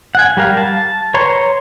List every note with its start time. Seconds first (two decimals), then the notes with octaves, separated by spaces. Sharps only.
0.15 F#5 G#5
0.37 G3 G4 A#4 F5
0.57 A5
1.14 B4 C#5 A#5 C6 C#6